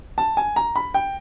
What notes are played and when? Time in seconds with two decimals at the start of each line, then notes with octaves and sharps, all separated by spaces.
0.18 A5
0.37 G#5
0.56 A#5
0.76 B5
0.94 G5